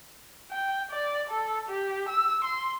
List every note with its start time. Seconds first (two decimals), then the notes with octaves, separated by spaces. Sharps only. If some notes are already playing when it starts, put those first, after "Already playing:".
0.51 G5
0.91 D5
1.30 A4
1.69 G4
2.09 E6
2.44 C6